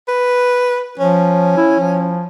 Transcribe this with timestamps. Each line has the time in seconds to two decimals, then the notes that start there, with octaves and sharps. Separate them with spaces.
0.09 B4
0.99 F3 C#4
1.57 E4
1.80 F3